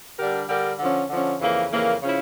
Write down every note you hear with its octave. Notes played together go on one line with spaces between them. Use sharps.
D3 G3 D4 G4 A#4
D3 G3 D4 G4 A#4
D3 F3 C#4
D3 F3 C#4
F2 C#3 E3 A#3
F2 C#3 E3 A#3
C#3 F3 C#4 E4